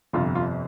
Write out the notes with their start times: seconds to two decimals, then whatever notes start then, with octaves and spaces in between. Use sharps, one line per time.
0.13 G1 F2 C3 F4
0.35 F4